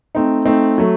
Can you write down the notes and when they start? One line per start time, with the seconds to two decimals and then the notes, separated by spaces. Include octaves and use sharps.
0.15 A3 C4 D#4
0.45 A3 C4 D#4
0.78 F#3 A3